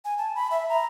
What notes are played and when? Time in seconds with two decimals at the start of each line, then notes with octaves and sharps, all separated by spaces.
0.05 G#5
0.18 A5
0.35 B5
0.51 E5
0.69 A#5